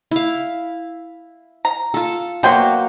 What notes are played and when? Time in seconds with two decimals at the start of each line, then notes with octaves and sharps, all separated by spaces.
0.11 E4 F5
1.65 A#5
1.94 F4 A4
2.43 B2 F#3 A#3 F#4 G5 C6